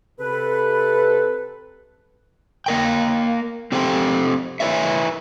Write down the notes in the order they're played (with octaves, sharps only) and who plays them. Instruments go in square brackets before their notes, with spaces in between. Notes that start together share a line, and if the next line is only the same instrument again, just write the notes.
[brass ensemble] C3 A4 [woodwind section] B4
[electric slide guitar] A#3 A#4 G5
C4 G4 A4 C5 F#5 G5
E4 A#4 B4 C#5 E5